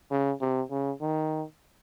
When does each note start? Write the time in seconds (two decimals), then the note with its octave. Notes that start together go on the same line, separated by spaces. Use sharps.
0.11 C#3
0.41 C3
0.71 C#3
1.01 D#3